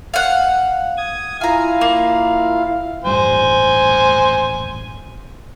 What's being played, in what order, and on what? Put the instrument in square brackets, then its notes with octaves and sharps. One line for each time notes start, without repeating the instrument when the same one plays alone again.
[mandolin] F5 F#5
[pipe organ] D#6 G#6
[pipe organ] E4 F4 F5 [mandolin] G#5 A#5
[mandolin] A#3
[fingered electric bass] D#1 A1 G2 [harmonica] C5 G#5